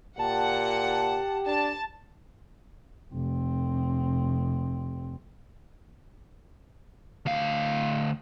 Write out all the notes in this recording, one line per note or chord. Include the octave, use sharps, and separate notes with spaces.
A#2 G4 F#5 A5
D4 A5
F1 C4
D2 F5